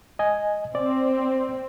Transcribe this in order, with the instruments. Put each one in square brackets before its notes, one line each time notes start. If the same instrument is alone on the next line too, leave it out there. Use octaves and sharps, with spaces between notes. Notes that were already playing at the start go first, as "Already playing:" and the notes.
[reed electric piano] D#5 G#5
[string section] C4 [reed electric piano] D5